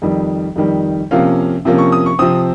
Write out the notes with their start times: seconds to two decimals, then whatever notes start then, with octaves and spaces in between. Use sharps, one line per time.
0.02 F2 D#3 G3
0.56 F2 D#3 G3
1.11 C3 F3 A#3 C#4 F5
1.65 C3 F3 A#3 C#4
1.78 C#6
1.92 D#6
2.06 C#6
2.19 C3 F3 C4 D#6